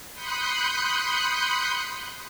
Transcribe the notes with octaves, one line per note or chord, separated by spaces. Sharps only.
B5 C6 D#6 F#6 G6 C#7